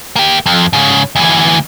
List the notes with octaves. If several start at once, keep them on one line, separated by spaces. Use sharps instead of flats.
A#3 G4
F2
G#2 C#3
D2 E3